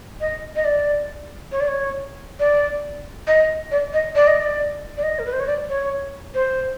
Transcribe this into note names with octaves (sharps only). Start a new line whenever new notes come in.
D#5
D#5
D5
C#5
D5
C#5
D5
D#5
D5
D#5
D5
D#5
D5
D5
D#5
A#4
B4
C5
C#5
D5
C#5
C5